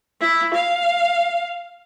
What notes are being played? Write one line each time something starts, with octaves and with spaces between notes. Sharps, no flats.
E4
F5